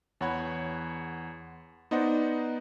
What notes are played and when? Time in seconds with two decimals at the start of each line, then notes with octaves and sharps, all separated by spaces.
0.21 E2 C#5 F#5 B5 G#6
1.91 B3 D#4 C5 D5 D#5 F#5